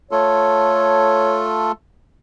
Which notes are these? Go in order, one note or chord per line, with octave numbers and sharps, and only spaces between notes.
A3 F4 A4 C#5